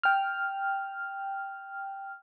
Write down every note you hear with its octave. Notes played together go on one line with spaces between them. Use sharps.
G5 F6